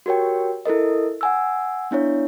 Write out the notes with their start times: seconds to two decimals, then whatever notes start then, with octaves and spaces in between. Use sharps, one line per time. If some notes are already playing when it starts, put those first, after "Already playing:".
0.06 F#4 G4 A#4 C#5 G5
0.66 E4 A4 A#4 D#5
1.21 F#5 G#5 E6
1.91 B3 D4 E4 C#5